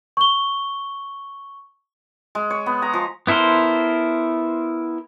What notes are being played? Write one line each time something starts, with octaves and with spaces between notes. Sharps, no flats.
C#6 G7
G#3
C#5
B3
A#5
F3
B3 E4 A4 A#4 C5